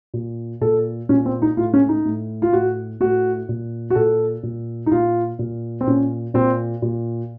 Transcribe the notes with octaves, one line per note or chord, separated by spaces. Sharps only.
A#2
A#2 A4
A#2 C#4
C4
D#4
A2 F4
C#4
D#4
A2
F4
A2 F#4
A2 F#4
A#2
F#4
A#2 A4
A#2
D#4
A#2 F4
A#2
C4
A#2 C#4
A#2 C4
A#2